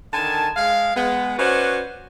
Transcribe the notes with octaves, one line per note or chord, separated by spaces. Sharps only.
D3 D#3 G#5 A5
G#3 F5
G#3 B3
C#4 F#4 B4 C5 D5